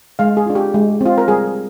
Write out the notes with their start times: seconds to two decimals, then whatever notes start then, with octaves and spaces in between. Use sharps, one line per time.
0.19 G#3 F5
0.37 G#4
0.46 D4 F4
0.55 G4
0.74 G#3
1.01 C4 F4
1.18 A#4
1.28 G3 G#4